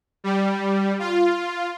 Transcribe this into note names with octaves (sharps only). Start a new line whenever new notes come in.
G3
F4